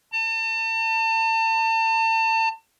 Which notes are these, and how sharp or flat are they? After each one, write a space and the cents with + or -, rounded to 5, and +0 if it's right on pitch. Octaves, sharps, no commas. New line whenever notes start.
A5 +35